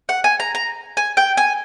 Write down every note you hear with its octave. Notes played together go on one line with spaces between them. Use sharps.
F#5
G#5
A#5
A#5
G#5
G5
G#5